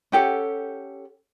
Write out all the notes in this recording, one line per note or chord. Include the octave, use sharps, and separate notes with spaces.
C#4 G4 A4 F#5